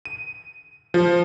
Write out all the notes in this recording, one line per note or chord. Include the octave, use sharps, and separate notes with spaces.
D#7
F3